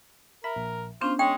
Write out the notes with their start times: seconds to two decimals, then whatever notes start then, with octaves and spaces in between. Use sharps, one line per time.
0.44 A#4 E5 B5
0.56 A#1
1.01 B3 C#4 D4 F4 C5
1.19 G#3 C#5 G5